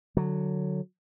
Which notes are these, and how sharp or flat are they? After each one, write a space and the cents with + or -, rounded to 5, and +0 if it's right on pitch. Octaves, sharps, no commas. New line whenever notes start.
D3 +10 F#3 +0